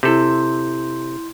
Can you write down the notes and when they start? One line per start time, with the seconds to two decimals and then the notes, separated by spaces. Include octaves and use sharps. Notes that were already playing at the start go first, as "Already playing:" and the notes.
0.03 C3 E4 A4 C6 G6